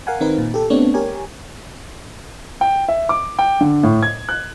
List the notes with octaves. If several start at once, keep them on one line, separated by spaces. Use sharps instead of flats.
A#4 F5 F#5 G#5
D#3 C4 D#4 A#4 B4
A#2
G4 A4
A3 B3 C4 D4 C#5
G4 A#4 C#5 G#5
G5
E5
D6
G5
D3
A2
G#6
F#6